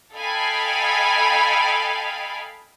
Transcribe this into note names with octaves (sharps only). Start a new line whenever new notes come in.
A4 D#5 F5 G5 G#5 B5